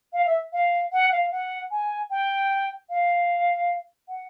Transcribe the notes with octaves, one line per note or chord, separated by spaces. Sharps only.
F5
E5
F5
F#5
F5
F#5
G#5
G5
F5
F#5